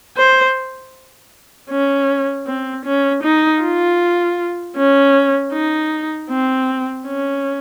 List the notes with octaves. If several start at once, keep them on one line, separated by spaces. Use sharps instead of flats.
C5
C#4
C4
C#4
D#4
F4
C#4
D#4
C4
C#4